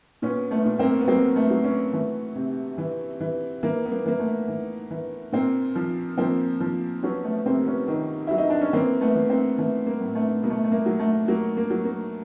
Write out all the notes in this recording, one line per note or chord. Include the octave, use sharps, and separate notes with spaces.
A#2 B3 C#4
A3 B3
A#2
A#3 C4
B3
F#3 A#3 C4
A3 B3
F#3
B3 C#4
E3 A3
C3
E3
E3
E3 A#3
B3
A#3
E3 A#3
A3 B3
E3
E3
A#2 A#3 C4
F3
F3 A#3 C4
F3
F#3 B3 C#4
A3 B3
C3 A#3 C4
B3 C#4
D#3
F#3 E4
D#4
D4
C#4
E3 A#3 C4
A3 B3
E3
A#3 C4
E3 A3 B3
A#3
A2
A3 B3
B2 A#3
A3
A3
A#3
F#3
A3
F#3 A#3
A#3
F#3
A#3